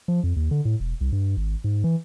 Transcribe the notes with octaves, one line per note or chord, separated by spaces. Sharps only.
F3
F2
D#2
D3
A2
E1
C2
G2
G#1
G#2
E3